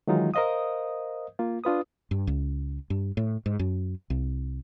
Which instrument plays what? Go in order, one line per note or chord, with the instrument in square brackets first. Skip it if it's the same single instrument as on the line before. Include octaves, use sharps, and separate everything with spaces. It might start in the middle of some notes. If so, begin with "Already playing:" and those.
[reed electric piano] D#3 E3 F#3 G#3 D#4 F4
A#4 C5 D#5 F5 D#6
A#3 F4
D4 F4 B4 D#6
[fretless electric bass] G2
C#2
G2
A2
G#2
F#2
C2